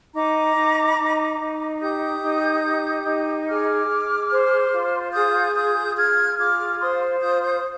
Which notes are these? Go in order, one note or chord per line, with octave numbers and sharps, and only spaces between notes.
D#4 A#5 D6
D#4
D#4
D#4
G4 D#6 G6
D#4
G4
D#4
G#4 D6 F6
G#4
C5
F4
G#4 D#6 G6
F4 D#6 G6
G#4 F6 G#6
F4 D6 F6
C5 C6 D#6
F4 D#6 G6
D#6 G6